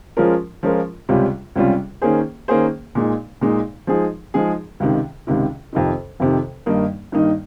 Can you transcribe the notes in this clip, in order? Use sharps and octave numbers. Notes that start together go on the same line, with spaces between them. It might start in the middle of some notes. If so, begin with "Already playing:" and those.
F3 G#3 C#4 F4 A#4
F3 G#3 C#4 F4 A#4
C#2 C3 G3 C#4 F4
C#2 C3 G3 C#4 F4
D#3 A#3 C#4 G#4 C5
D#3 A#3 C#4 G#4 C5
A#2 G#3 D#4
A#2 G#3 D#4
F3 G#3 D#4 G#4
F3 G#3 D#4 G#4
C#2 C3 D#3
C#2 C3 D#3
F2 C3 D#3
F2 C3 D#3
G2 D#3 A#3 D#4
G2 D#3 A#3 D#4